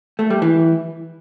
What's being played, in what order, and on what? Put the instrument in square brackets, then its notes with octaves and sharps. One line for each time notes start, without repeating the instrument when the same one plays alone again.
[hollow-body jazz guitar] A3
G3
E3